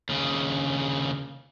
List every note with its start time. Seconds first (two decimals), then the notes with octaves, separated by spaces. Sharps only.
0.09 D#2 C#3